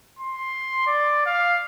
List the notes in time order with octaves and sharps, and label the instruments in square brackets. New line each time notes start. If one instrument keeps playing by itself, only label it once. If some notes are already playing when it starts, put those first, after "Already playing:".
[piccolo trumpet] C6
D5
F5